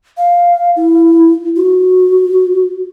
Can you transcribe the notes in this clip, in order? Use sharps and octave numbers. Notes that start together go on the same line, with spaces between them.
F5
E4
F#4